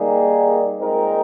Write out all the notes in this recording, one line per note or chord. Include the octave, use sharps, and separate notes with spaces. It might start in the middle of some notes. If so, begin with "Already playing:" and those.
Already playing: D#3 G3 A#3 D#4 G#4
A#2 G#3 C4 D#4 A#4